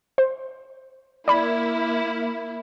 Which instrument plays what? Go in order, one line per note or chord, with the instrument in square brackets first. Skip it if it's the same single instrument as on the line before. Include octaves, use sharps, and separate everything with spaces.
[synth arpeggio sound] C5
[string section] A#3 E4 [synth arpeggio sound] D5 B5